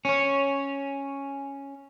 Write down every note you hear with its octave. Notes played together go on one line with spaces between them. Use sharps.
C#4 C#5